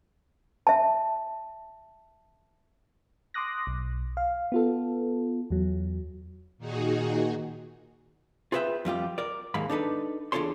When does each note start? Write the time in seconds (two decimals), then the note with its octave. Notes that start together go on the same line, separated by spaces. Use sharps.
0.67 E5 A5
3.34 C6 D6 D#6 F#6 A#6
3.67 B1
4.17 F5
4.52 B3 F4 A4
5.50 E2 F#3
6.58 A#2 D#3 D#4 F#4 G#4
8.52 F4 G#4 B4 D5 E5 G5
8.85 F2 G3 F4 G4
9.18 A#4 D5
9.54 D#2 G#2 A#3 B5
9.70 D4 D#4 A4 B4
10.32 E2 D4 F4 A4 C#5 C6